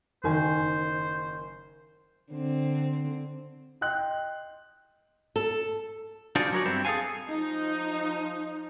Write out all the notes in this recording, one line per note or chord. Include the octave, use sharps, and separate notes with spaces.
F#1 D#3 C5 G#5
D3 C4
D#5 G5 C6 F#6
A4
D4 F4 F#4 G#4 C5 D5
F#3 F#4 A#4 C#5 D5
G2 B3 C4 E4
G#4 A4 B4 F5 G#5
F3 D#4